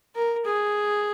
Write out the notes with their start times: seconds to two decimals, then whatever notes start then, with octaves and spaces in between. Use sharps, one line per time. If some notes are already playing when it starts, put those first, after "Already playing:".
0.15 A#4
0.45 G#4